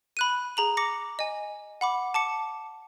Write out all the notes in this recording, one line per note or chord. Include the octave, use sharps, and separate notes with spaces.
B5 F#6 D#7
G#4 A#5 F#7
D6 A#6 C#7
D#5 G#5
F#5 B5 D6
A5 D6 C#7